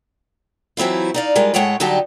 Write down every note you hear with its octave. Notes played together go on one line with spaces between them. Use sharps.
E3 F#3 C4 E4 F4
D#4 D5 F5
G3 G#3 D#4 F4 A#4
A2 G#3 A3 C#5 F#5 G5
D3 F#3 G3 D#4 G4 A5